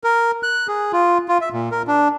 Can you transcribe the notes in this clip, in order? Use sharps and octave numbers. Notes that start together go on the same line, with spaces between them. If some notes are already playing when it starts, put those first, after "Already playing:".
A#4
F#6
G#4
F4
F4
E5
A#2
A#4
D4